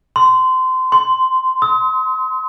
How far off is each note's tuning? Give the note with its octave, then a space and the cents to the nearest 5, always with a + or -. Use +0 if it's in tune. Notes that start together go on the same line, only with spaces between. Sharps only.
C6 -25
C6 -10
D#6 +45